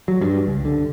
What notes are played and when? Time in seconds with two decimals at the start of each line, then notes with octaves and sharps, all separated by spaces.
0.08 F#3
0.21 G2
0.47 C#2
0.65 D3